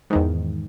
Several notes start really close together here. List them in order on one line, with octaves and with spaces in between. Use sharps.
G#2 D#3 E2